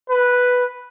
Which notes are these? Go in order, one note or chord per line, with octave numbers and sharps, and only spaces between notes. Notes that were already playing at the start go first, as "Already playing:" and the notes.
B4